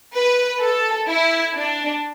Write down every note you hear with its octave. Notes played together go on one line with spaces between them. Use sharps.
B4
A4
E4
D4